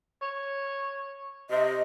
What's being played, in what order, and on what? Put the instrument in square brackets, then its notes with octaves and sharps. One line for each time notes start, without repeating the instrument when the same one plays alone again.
[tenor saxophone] C#5
[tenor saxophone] C3 [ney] D#5